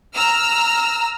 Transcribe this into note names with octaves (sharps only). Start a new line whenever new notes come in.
A#5 E6 F6